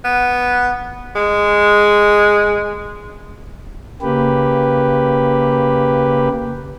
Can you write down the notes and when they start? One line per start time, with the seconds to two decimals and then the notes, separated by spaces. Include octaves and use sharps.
0.04 B3
1.15 G#3
4.02 C#3 A#3 G4 B4